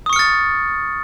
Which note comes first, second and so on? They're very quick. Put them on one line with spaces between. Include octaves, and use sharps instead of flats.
D#6 C#6 C#7 F6 A6